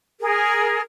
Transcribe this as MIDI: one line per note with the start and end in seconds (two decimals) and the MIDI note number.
0.20 0.81 68
0.20 0.81 70